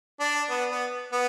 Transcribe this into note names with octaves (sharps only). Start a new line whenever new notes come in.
D4
B3
B3
B3